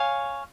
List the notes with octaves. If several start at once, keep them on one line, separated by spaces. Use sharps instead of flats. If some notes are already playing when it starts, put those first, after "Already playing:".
Already playing: C#5 F5 G#5